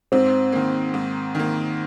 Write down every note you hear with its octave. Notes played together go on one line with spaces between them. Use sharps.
G#2 C4
D#3 A#3
G#2
D#3 A#3